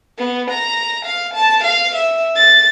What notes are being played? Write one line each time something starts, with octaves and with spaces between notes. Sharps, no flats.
B3
A#5
F5
A5
F5
E5
A6